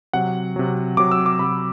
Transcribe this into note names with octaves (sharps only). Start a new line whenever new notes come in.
C3 F#3 F#5
C3 F#3
C3 F#3 D6
E6
D6
C3 F#3 B5